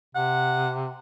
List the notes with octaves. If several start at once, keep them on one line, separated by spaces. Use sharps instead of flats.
C3 F#5